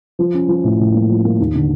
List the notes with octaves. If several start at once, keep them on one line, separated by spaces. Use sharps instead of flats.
F3
C#4
F3
A2
A2
A#3
F3
A#3
D#2
D3